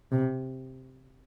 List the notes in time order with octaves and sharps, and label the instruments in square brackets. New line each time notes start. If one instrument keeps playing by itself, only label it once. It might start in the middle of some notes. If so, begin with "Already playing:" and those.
[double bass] C3